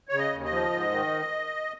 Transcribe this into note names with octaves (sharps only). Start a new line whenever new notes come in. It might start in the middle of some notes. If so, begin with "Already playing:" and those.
C#3 C#5
D#5
D#2
D#5
F3
G#2
D#3